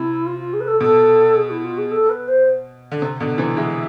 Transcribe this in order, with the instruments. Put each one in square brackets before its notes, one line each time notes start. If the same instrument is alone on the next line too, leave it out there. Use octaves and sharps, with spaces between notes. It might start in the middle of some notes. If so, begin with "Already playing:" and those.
Already playing: [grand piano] C3 [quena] E4
[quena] F4
F4
G#4
B4
A4
[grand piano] B2 [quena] A4
[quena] G#4
E4
F4
G#4
A4
B4
C5
[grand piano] D3
C3
B2 D3
C3 E3
[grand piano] E3 G#3 [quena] E5